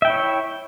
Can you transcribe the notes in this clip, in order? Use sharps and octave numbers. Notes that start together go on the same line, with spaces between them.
E4 C#5 E5 G5